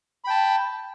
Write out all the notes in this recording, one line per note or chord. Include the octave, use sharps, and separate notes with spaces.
G5 A5 B5